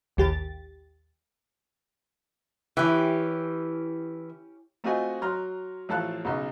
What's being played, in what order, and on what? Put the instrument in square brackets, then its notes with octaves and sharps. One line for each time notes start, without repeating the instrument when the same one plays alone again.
[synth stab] A1 D#2 G4 A6
[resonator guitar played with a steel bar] E3 [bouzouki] C#4 G4
[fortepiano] A3 C4 F4 F#4 D#5 G#5
F#3 A#5 C6 F6
A1 F3 A4 F5 A5 F#6
B1 C#3 D#4